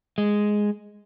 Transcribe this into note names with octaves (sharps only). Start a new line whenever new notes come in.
G#3